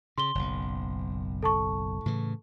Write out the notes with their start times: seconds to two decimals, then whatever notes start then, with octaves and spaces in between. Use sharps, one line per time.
0.18 C#3 C6 G7
0.35 F#1 B1
1.43 A4 A5 C#6
2.06 A2 C#3 E3